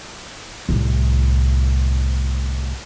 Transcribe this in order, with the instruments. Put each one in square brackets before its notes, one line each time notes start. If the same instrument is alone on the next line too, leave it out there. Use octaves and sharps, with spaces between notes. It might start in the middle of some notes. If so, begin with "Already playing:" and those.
[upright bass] C2 A2